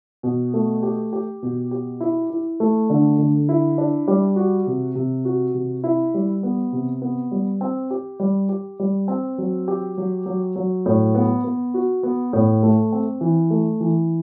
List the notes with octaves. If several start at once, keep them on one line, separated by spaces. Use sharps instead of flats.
B2
A3
G4
G4
B2
G4
E4
E4
A3
D3
D3
E4
D4
G3
F#4
C3
C3
F#4
C3
E4
G3
B3
C3
B3
G3
C4
G4
G3
G4
G3
C4
F#3
G4
F#3
F#3
F#3
A2
B3
B3
F#4
B3
A2
A3
C4
E3
A3
E3